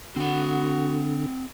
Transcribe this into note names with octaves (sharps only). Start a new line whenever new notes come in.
D3 C4 F#4 F#5